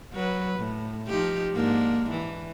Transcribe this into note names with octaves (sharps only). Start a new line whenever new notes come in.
F#3 B4
A2
F3 D#4 G4
G#2 A#3 D4
E3